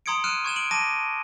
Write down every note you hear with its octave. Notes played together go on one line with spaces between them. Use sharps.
A#5 C6 D#6 G#6 C#7 D7
F6 F#6 C#7 D#7 E7
C#6 G#6 E7 G7
D7 F#7
A5 D6 A#6 D#7